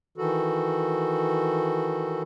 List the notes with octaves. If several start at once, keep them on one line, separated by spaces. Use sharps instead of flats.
D#3 E3 F#4 A4